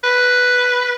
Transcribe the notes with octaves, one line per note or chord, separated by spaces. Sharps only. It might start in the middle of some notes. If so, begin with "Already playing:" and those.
B4